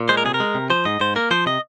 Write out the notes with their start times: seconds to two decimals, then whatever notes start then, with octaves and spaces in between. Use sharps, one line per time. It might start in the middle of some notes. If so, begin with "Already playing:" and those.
Already playing: A#2
0.09 G#3 C5
0.17 A#4
0.24 C3 G#4
0.34 A#4
0.40 G#3
0.55 C3
0.70 F3 C5
0.85 G#2 D#5
1.00 G#2 C5
1.16 A#3 A#4
1.31 F3 C5
1.46 C3 D#5